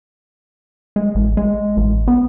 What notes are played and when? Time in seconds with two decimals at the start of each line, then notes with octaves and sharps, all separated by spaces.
0.96 G#3
1.15 A1
1.37 G#3
1.77 A1
2.08 B3